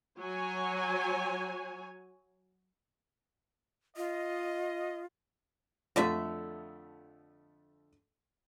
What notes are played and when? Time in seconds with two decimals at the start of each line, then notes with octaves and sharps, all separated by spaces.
0.19 F#3 C#5 G#5
3.97 F4 D#5
5.96 F2 D3 F3 A3 D5 E5